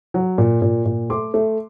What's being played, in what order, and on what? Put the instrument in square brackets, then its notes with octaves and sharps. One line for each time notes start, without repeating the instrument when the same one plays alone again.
[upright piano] F#3
A#2
A#2
A#2
A3 C6 D6
A3